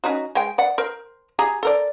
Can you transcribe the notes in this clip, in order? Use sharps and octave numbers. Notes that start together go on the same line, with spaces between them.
C#4 D#4 F#4
G#3 G5
D5 F#5
A#4 C5
G4 G#4 A#5
A4 A#4 D5